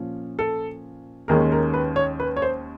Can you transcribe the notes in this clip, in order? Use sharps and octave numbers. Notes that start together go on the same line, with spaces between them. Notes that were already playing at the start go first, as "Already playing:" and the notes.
Already playing: A#2 F3 C#4
A4
D#2 D#3 G#3 C#4 A#4
A#4
B4
C#5
B4
C#5
C5